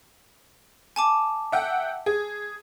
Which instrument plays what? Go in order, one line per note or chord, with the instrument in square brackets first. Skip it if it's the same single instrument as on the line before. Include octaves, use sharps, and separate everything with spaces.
[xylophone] G#5 A5 D6
[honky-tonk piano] E5 F#5 G5
G#4